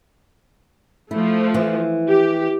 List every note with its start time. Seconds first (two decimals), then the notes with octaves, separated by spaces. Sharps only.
1.11 F3 A3 E4
1.54 E3
2.08 G4